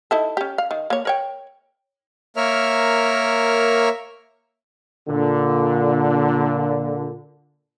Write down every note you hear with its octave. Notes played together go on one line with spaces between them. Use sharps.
D#4 E4 A4
C#4 G4
F5
D#3
A#3 C#5
A#4 C#5 G5
A#3 A#4 C#5 E5 F6
A#2 D3